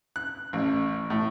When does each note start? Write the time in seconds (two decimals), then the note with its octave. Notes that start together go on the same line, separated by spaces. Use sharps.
0.16 F#6
0.53 A1
1.10 A2